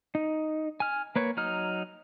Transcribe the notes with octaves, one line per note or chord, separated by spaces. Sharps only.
D#4
G#5 F6
A#3 B4 C#5
F#3 D#4 F6